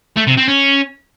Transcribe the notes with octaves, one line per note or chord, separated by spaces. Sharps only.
A3
C3
C4
C#4